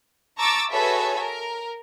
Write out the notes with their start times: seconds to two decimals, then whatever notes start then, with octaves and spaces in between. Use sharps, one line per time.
0.37 A5 A#5 C#6 D6 E6 A6
0.69 F#4 G#4 A4 B4 C#5 E5
1.20 A#4